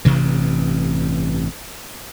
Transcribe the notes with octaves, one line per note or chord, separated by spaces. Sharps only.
A1 G2 C3 E3